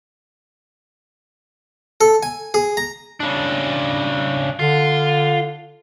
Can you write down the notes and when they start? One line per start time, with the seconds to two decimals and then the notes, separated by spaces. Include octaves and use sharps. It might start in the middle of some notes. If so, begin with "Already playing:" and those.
2.01 A4
2.23 G#5
2.54 G#4
2.77 A#5
3.20 C#3 D4
4.59 D3 F4